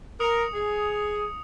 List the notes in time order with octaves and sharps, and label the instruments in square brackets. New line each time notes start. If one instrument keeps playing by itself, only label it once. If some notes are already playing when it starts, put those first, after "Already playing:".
[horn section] A#4 [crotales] D#6 C#7 F7
[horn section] G#4